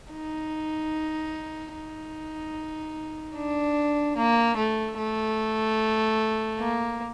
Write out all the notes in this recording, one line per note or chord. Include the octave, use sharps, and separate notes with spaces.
D#4
D#4
D4
A#3
A3
A3
A#3